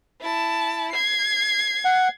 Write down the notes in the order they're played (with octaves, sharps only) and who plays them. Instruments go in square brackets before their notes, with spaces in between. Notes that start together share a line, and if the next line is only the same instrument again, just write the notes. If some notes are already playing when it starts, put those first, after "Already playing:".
[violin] E4 A5
G#6 C7
[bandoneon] F#5